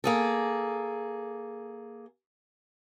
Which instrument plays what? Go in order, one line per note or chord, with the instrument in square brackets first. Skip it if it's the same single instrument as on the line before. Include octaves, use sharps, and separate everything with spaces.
[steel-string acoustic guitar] A#3 G#4 A4